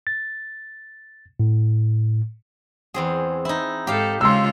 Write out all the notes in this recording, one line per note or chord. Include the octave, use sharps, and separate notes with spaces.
A6
A2
E2 C4 G#4
D#4 E4
G#2 G4 A4 F5
C#3 G#3 F4 C6 E6